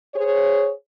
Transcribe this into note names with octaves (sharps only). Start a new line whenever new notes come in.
G#4 C5 C#5